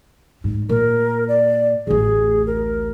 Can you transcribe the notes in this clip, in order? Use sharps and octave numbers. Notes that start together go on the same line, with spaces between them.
G#2
A#2 A#4
D5
D1 A1 G#4
A#4